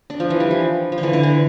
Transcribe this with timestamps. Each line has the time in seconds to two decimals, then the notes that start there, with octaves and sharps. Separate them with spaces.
0.10 D4
0.20 F3
0.30 E3
0.40 G3
0.51 F3
0.92 F3
0.98 D3
1.03 E3
1.13 D3
1.23 E3